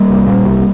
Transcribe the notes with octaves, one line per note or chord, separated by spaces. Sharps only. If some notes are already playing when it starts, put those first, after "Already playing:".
Already playing: G3 A#3
C2
A#2
C2